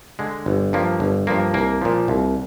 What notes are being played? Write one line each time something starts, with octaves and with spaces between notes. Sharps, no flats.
D3 G#3
G1
G2 F3 A#3
G1
G2 F3 A#3
C2 A#3
A#2 F3
C2